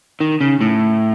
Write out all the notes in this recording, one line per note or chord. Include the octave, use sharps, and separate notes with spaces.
D#3
C#3
A2